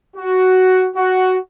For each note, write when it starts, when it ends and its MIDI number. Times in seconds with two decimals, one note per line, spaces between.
0.17 0.88 66
0.96 1.37 66